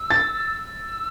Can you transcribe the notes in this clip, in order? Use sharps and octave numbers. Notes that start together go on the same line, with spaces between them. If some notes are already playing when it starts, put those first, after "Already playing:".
Already playing: E6
A6
E6